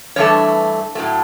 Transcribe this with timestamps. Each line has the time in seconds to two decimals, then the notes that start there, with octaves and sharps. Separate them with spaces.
0.16 G2 E3 A3 C#5
0.95 A2 F#3 A3